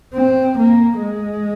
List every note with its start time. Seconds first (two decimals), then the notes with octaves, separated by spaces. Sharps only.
0.14 C4
0.58 A#3
1.01 G#3